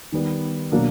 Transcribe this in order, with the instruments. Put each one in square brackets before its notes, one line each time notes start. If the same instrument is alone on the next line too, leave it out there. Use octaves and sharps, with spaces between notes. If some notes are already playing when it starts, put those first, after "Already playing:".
[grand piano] D#3 G3 B3
B2 F#3 A#3 D4